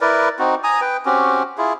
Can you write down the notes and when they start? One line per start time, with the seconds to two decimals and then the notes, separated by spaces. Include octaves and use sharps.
0.01 E4 A#4 B4 D5
0.39 C4 D#4 F#4
0.64 G#5 A#5 D#6
0.81 B4 G5
1.06 C4 C#4 F#4 G4
1.58 E4 F4 G#4